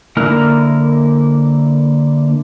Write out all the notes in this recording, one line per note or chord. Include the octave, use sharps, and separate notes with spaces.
D3 A#3 E4 A#5 F6